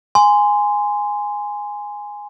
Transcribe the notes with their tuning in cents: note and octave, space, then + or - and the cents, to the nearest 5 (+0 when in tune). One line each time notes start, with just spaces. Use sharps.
G#5 -5 C6 -15